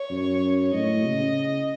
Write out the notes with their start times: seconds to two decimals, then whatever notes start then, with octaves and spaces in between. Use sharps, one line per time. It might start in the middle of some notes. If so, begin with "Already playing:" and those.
Already playing: C#5
0.11 F#2
0.74 A2 D#5
1.06 C#3